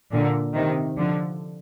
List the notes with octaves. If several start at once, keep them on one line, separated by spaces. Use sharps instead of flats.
A#2 D3
C3 D#3
D3 F3